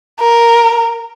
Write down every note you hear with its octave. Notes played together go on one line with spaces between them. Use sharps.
A#4